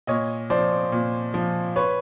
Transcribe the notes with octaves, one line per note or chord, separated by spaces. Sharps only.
A#2 C#5 D#5
F3 C5 D5
A#2
F3
B4 C#5